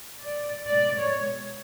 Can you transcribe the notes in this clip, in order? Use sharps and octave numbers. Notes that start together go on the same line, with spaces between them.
D5
B2 G#3 D5
C#5